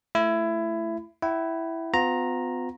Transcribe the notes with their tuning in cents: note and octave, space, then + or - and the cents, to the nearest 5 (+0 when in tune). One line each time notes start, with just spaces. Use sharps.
A3 +0 E4 +20
E4 +0 F#5 +45
B3 +45 F4 +35 A#5 +0